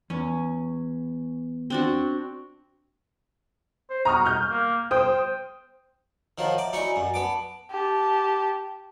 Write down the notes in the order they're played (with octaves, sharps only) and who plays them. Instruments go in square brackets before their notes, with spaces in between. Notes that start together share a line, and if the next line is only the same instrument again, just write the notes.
[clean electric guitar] E2 [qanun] C#4
[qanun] C4 D4 F#4
[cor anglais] C5
[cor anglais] F#4 [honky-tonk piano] A#5 D#6 F6
[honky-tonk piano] F6 G6
[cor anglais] A#3
[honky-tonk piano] C5 D#6 [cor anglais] G5
[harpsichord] D#3 F3 [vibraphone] C#5 F#5 A#5
[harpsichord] D5 [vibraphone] E5 A#5
[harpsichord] D#4 E4 C#6 [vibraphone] F#4 D5 G#5
[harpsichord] F#2
[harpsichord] B3 D6 [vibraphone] A5
[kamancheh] G4 A5